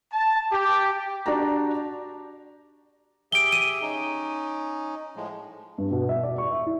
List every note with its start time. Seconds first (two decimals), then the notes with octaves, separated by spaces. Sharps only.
0.13 A5
0.52 G4
1.26 D4 F#4 G4 A5 A#5
3.32 G4 G#4 E5 D7 G7
3.52 D#7
3.82 C#4 D#4
5.16 A2 F3 G#3
5.78 G2
5.91 B2
6.09 E5
6.23 D5
6.38 C#6
6.52 E5
6.66 E4